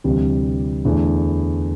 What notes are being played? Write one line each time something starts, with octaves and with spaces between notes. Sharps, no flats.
D2 C3 E3 G3
E2 D3 A3 E4